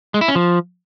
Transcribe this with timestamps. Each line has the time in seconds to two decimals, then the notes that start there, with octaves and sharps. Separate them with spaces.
0.14 G#3
0.21 E4
0.28 C#4
0.35 F3